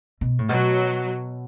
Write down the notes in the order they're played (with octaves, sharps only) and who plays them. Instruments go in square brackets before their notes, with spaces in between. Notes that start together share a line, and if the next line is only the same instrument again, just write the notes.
[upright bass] B2
A2
[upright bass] B2 [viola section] F#3